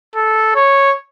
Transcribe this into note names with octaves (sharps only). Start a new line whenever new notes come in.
A4
C#5